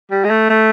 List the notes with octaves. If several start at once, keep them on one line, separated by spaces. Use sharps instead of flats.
G3
G#3
A3
A3